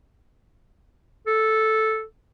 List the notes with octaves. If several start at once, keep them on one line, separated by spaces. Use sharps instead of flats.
A4